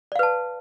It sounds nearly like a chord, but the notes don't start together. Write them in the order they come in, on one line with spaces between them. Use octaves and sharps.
D5 F5 B4 A5